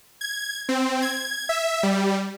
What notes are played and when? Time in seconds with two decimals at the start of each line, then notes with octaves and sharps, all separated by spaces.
0.21 G#6
0.69 C4
1.02 G#6
1.49 E5
1.83 G3